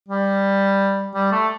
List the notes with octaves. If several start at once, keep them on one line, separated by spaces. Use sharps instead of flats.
G3
G3
A3